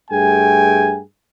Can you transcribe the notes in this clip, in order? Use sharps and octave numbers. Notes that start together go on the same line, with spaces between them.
G2 A3 G#4 G5 G#5